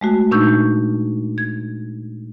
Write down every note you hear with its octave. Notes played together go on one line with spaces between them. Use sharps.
G#3 A3 F#4
A#2 D4 D#4 C#6 E6 G6
G#6